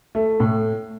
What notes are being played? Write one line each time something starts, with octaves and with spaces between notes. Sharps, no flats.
A3
A2